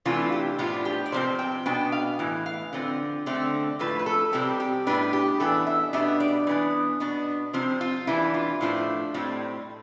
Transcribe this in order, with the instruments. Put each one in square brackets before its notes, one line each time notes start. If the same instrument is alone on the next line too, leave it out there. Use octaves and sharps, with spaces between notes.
[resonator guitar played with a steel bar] C3 E3 A3 D4 F4
G4
A2 F3 B3 D4 F4
G4
D5
C3 F3 C4 C5
G5
B2 B3 D4 G5
F5
A2 E3
F5
D3 F3 C4
D3 A3 C4
A2 F3 A3 B4
B4
A4
C3 G3 C4 G4
G4
A2 G3 B3 D4 B4
G4
E3 B3 D4 A4
E5
B2 G3 B3 D4 E5
D5
E3 B3 D4
B2 B3 D4
C3 F3 C4 C5
F4
E3 G3 B3 D4 E4
F4
A2 F3 A3 D4
A2 G3 C4